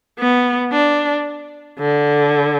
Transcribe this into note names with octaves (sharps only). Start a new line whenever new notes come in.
B3
D4
D3